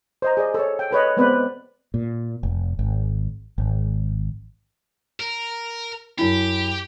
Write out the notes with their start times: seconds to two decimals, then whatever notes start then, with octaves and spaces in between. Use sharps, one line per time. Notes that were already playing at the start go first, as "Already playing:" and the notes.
0.22 C5 D#5 A#5
0.37 G#4 D5 D#5
0.54 A4 C#5
0.79 G5
0.91 A4 B4 C#5 D#5
1.17 G#3 B3 C4 B4 C5 D5
1.94 A#2
2.43 F1
2.79 G#1
3.58 G#1
5.20 A#4
6.18 F#2 E4 G4